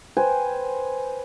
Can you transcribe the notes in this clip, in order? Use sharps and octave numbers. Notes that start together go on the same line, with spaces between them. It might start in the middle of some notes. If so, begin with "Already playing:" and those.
B4 C5 G5 G#5